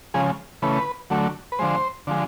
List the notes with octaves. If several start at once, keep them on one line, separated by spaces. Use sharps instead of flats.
C#3 F3 G#3 G#4
C#3 E3 A3 B4
D3 F#3 A3
B4
D3 F3 G#3 C5
D3 F3 G#3